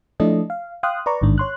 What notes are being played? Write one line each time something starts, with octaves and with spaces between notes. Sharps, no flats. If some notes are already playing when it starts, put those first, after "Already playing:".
F3 A3 D4 E4 A4 D#5
F5
F5 G5 C6 D#6 F#6
B4 D5 A#5 C#6
A1 G#2 D#3 D4
C#5 C6 F#6